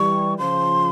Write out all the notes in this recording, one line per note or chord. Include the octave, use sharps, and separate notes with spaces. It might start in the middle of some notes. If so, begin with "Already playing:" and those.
Already playing: E3 G3 C#6
C#3 F3 C6